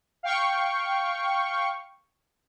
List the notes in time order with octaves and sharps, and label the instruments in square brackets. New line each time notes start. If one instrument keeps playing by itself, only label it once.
[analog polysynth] F5 G5 C#6